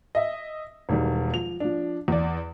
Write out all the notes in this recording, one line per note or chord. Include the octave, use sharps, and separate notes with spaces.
D#5 E5
E1 D#3 G3
F3 F7
F3 D4
E2 D5